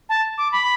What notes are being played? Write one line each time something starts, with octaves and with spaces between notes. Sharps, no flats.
A5
D6
B5